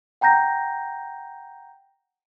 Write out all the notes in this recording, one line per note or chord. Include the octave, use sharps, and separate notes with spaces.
F#5 G5 A#5 G6 A#6